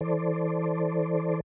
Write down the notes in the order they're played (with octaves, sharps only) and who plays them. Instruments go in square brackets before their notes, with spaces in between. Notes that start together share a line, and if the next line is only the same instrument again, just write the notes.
[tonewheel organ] E3 A4 C5 D5